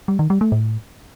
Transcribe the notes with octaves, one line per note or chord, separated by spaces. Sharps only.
G3
D#3
G3
A3
A2